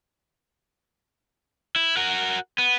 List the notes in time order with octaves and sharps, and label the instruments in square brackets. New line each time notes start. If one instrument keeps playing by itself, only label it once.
[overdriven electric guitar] E4
F#4 A#4
B3